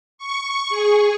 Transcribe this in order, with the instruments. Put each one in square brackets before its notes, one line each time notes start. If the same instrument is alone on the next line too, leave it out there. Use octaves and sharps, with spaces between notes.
[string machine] C#6
G#4